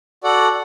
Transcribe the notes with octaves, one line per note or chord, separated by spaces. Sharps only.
F#4 A4 D5 F#5